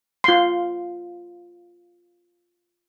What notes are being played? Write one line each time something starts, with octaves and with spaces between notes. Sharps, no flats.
F4 C6